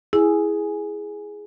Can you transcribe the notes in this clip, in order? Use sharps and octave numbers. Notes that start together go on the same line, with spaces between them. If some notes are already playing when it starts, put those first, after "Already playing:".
E4 G#4